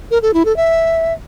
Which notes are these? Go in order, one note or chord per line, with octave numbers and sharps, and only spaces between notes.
A#4
A4
E4
A4
E5